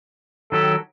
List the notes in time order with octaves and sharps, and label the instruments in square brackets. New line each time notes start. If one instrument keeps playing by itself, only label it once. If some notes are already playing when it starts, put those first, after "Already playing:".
[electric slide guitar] D#3 F#3 G4 [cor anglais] A4